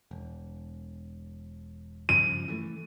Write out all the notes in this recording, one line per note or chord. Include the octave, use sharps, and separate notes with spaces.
E1
G2 C#3 F3 D#7
E3 G3 A3